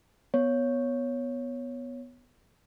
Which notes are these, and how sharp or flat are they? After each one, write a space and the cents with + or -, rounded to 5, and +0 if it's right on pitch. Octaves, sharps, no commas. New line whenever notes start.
B3 +0 C#5 +0